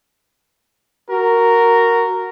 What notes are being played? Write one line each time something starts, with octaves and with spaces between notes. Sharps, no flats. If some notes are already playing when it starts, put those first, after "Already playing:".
F#4 A#4